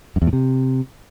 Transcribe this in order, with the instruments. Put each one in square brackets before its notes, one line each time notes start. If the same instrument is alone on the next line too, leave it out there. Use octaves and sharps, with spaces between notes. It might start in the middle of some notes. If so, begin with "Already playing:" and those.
[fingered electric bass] F#2
E2
A2
C3